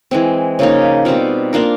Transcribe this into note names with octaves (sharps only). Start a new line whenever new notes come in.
E3 G#3 C4
C#3 F3 A#3 D#4
B2 G3 C4 F4
A#3 D4 F4 A#4